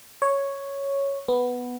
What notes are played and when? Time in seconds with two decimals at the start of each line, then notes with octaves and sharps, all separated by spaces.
0.22 C#5
1.28 B3